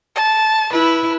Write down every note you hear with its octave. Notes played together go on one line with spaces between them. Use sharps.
A5
E4 B4